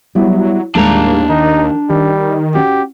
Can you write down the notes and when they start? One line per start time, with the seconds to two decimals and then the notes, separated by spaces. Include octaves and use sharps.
0.15 F#3 G3 B3 E4
0.75 D#2 A2 G3 G#3 A#3 D4 A#5
1.29 D#3 D#4
1.90 D#3 G3 G4
2.55 C#4 F#4 G4